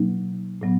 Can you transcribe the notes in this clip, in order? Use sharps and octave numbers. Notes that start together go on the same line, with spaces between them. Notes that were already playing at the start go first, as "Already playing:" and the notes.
Already playing: B2 F#3 A#3 D#4
A2 F#3 B3